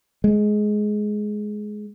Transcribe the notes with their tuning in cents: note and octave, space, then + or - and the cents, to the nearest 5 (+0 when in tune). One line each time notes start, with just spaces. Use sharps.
G#3 +15